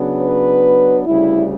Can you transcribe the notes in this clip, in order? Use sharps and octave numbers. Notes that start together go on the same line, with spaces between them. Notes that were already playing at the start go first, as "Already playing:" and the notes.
Already playing: C#3 F#3 B3 D4
B4
D2 C#3 G3 E4